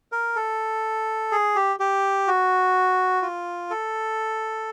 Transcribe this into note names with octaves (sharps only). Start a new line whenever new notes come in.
A#4
A4
G#4
G4
G4
F#4
F4
A4